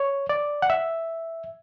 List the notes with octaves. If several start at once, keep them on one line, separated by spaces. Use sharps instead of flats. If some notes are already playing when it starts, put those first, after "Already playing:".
Already playing: C#5
D5
F#5
E5